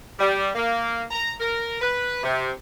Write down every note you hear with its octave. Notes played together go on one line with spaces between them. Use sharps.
G3
A#3
A#5
A#4
B4
C3